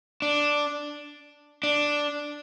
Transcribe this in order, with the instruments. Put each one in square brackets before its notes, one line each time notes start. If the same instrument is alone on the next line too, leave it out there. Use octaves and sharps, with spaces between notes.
[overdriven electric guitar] D4
D4